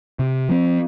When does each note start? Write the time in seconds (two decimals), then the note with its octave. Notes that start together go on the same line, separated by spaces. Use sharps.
0.19 C3
0.49 F3 C4